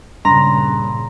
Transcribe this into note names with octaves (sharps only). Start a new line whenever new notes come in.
G2 A#2 C#3 A#5 C6